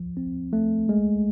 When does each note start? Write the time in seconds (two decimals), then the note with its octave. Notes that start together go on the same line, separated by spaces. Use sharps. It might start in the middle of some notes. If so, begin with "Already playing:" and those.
Already playing: F3
0.17 C4
0.53 A3
0.89 G#3